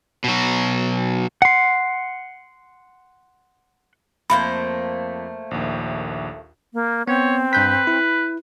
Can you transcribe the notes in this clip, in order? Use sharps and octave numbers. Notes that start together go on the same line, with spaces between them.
B2 F#3
F#5 C6
F2 A3 A#3 C5 B5
A#1 D#2
A#3
B3 C4 C#5
G2 B4 G6 B6
E4